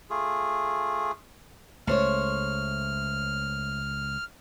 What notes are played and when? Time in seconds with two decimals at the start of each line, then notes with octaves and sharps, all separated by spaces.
0.10 A3 F4 G#4
1.87 C#2 A3 C5 C#5 F6